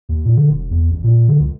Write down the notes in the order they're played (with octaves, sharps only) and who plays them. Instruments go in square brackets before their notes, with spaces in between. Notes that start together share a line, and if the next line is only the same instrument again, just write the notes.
[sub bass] D#2
A#2
D3
E1
E2
A1
A#2
D3
C#2